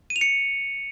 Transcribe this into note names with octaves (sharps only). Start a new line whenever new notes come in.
D#7
F7
C#7